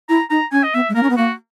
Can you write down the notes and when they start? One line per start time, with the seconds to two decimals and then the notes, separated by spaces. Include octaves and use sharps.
0.09 E4 A#5
0.30 D#4 A#5
0.52 C#4 G#5
0.64 D#5
0.74 B3 E5
0.89 G#3
0.95 A#3 A#4
1.03 C#4
1.10 B3
1.17 A#3 F#4